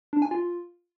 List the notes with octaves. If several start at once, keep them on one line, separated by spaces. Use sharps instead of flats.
D4
G#5
F4